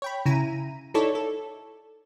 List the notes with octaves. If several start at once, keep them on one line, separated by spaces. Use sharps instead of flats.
C#5 G5 B5
C#3 E4 A#5 D#7
D#4 E4 A4 C#5 D5
A4